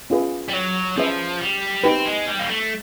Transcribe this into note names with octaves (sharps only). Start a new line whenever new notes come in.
C#4 F4 G#4 B4 E5
G3
F#3
F3 C#4 F4 G#4 B4 E5
G3
C4 D#4 G4 B4
G#3
G3
A#3
A3